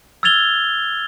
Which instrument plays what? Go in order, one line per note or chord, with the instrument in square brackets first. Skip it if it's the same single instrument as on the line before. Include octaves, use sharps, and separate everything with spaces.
[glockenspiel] E6 F6 G#6 A6 F7 G7